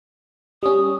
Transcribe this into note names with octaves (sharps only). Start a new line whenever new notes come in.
G3 C#4 D#6